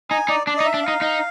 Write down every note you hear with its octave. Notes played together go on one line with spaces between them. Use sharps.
D#4 G#5
D#4 D5
D4 D5
D#5
D#4
E5
D4
F5
D#4
D#4